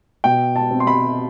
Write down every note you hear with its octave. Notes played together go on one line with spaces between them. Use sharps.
B2 G5
A5
C4
C6
B5